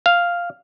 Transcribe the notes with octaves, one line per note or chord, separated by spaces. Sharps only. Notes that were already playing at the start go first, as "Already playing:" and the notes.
F5